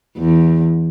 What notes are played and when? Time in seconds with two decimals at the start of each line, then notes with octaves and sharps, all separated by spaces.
0.18 E2